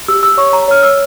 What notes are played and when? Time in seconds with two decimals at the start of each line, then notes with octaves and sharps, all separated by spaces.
0.08 G4 E6
0.23 E6
0.37 C#5 C#6
0.53 A#5
0.68 C#5 F6
0.83 E6